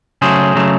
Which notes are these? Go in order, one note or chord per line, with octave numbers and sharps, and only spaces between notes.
C#3 F#3 A3 G#4 C5
C#3 F#3 A3